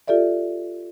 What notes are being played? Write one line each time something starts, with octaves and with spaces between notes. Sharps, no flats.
F4 G4 A4 D5 E5